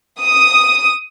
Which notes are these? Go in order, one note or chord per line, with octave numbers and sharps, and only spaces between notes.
D#6